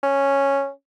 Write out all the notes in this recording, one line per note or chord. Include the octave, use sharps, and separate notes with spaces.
C#4